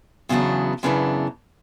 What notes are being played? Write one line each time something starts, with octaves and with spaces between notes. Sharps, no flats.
E2 C#3 F#3 B3 D4
F#2 C#3 E3 B3 D4